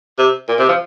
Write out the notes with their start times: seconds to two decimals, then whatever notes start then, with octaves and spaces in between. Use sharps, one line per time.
0.18 C3
0.49 A#2
0.59 C3
0.69 F3